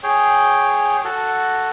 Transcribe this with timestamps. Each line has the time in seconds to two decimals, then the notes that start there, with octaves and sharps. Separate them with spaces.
0.03 G#4 C#5 G5
1.04 F#4 A4